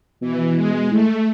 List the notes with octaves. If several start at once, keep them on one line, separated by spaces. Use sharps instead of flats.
B2 E3
G#3
A2 A3